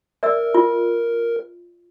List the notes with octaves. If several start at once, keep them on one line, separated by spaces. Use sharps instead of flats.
A#4 D5 E5 E6
F4